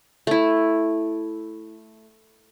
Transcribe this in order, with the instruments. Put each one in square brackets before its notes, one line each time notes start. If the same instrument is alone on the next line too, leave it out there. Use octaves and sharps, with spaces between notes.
[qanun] A3 E4